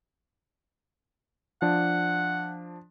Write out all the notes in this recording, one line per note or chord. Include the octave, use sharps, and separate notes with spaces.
F3 D4 F#5